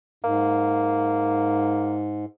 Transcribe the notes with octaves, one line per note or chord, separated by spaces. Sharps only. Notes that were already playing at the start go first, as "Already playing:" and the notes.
G#2 A#3